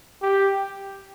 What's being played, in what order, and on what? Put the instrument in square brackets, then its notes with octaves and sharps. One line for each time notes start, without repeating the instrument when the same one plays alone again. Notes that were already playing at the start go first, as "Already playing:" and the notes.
[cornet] G4